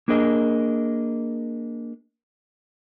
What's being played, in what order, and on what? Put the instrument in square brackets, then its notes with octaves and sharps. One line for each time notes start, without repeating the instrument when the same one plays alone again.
[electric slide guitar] A#3 D4 G#4 A#4 D#5